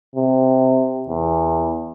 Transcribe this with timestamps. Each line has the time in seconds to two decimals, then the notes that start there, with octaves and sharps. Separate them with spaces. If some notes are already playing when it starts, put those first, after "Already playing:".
0.16 C3
1.08 E2